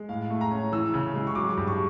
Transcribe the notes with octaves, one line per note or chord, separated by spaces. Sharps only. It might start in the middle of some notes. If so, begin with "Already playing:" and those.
Already playing: G#3
A2 F5
A3
A#5
C#4
E3 E6
C#3
G#3
C#6
F#3 D6
G2
C#6